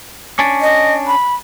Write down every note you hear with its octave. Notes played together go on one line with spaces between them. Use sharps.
C#4 D4
D#5
B5